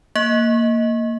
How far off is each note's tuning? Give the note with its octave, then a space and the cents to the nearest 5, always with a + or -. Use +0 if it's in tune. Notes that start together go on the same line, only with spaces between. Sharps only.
A#3 -10 D#5 +20